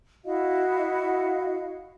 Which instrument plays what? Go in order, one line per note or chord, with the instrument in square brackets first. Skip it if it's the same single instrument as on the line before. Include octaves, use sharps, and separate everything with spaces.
[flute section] E4 F#4 D#5 F5